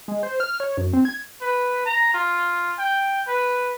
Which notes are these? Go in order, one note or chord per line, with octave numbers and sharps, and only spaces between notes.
G#3
C5
F6
C#5
F#2
C4
G#6
B4
A#5
F4
G5
B4